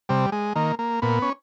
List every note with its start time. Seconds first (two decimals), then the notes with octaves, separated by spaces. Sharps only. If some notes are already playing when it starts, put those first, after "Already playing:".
0.09 C3 G3
0.32 G#3
0.56 D#3 A#3
0.79 A#3
1.02 A#2 B3
1.22 C#4